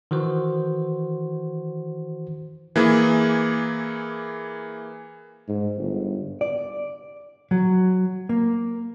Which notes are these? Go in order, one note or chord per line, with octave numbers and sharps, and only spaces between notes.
D#3 E3 F#4 C5
E3 A#3 G#4
G#2
G1
D5
F#3
A#3